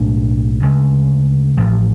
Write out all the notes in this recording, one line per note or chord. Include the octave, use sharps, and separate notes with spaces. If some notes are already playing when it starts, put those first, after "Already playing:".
Already playing: B1 A2 G#3 D4
D2 C#3 G#3
A1 A2 F3